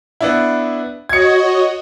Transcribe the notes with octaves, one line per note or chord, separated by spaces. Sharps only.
B3 D4 E4
F#4 C#5 D#5 G#6 C#7